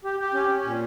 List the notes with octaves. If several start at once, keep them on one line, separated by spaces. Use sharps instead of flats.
G4
G4
C#4
C#4
A#2